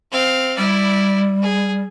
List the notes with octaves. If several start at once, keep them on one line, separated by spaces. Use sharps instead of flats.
C4 F5
G3 E4 D5
G#4